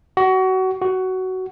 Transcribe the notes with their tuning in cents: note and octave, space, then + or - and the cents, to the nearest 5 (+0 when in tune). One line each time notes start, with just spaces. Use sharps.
F#4 +25
F#4 +15